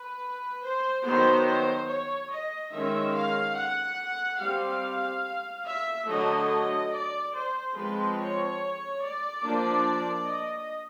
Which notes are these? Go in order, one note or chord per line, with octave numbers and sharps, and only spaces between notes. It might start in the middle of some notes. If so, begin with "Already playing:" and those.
Already playing: B4
C5
D#3 F#3 B3 C5
C5
C#5
D#5
D#3 G#3 C#4 E5
F5
F#5
G3 C4 F5
E5
D3 F#3 A3 D#5
D5
C5
F3 G#3 C4 B4
C#5
D5
F3 A#3 D4
D#5